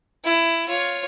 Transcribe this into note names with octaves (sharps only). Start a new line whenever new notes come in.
E4
F4 C#5